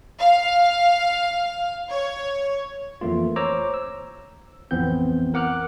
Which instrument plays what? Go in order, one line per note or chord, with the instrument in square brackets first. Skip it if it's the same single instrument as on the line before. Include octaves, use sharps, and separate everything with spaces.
[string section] F5
C#5
[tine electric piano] F2 E3 A3 A#3 F4
C5 C#5 A#5 D6 E6
E6
A1 F2 E3 B3 C4 G6
A#4 F#5 D6 F6 F#6